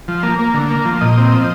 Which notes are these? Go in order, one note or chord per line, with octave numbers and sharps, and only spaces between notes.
F3
A#3
A#3
D3
A#3
F3
A#2 D#5
C4
F3